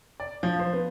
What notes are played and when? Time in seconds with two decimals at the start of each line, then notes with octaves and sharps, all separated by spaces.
0.20 D5
0.43 F3
0.59 C5
0.73 B3